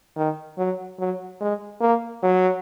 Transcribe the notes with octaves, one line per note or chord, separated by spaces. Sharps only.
D#3
F#3
F#3
G#3
A#3
F#3